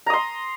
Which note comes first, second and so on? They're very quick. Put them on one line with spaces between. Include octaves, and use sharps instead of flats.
A#5 D#6 C6